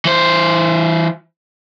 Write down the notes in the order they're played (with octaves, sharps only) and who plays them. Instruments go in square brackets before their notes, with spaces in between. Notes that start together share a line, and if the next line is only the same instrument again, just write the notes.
[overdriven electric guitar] E3 C5